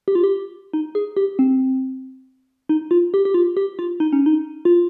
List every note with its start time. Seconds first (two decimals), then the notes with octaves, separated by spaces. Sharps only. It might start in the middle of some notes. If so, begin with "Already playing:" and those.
0.08 G4
0.15 F4
0.24 G4
0.73 D#4
0.95 G#4
1.16 G4
1.39 C4
2.69 D#4
2.91 F4
3.14 G4
3.25 G4
3.34 F4
3.57 G4
3.79 F4
4.00 D#4
4.13 C#4
4.26 D#4
4.65 F4